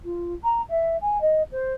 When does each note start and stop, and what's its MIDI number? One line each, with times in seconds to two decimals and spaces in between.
0.03 0.33 65
0.43 0.61 82
0.69 0.95 76
1.01 1.20 80
1.20 1.42 75
1.51 1.73 72